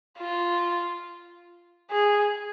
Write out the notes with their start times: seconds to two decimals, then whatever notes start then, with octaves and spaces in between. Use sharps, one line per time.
0.18 F4
1.91 G#4